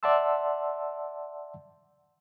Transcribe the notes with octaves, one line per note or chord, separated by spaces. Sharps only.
D5 E5 F#5 A5 C6 E6